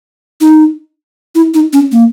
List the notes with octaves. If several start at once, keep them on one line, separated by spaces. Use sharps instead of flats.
D#4
E4
D#4
C#4
A#3